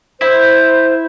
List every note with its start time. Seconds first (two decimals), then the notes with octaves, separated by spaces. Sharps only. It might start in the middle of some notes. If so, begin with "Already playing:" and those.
0.20 E4 C5